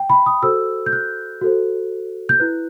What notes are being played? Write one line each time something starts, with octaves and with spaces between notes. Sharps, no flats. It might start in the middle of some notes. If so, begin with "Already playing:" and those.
Already playing: G5
B5
D#6
F#4 A4 C5 E6
G6
F#6
F#4 A4 C5
G6
E4 B4 F#6